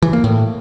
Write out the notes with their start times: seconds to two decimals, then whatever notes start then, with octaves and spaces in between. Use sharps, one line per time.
0.02 E3
0.13 A#3
0.24 A2